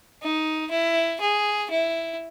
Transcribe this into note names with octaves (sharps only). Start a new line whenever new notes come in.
D#4
E4
G#4
E4